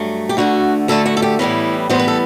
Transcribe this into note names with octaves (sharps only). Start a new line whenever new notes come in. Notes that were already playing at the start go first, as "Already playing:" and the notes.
Already playing: G2 F#3 A3
G4
D2 D3 A3 F#4
D2 D3 A3 A4
F#4
A4
G4
A2 E3 G3 B3 E4
A2 E3 G3 B3 C5
B4
A4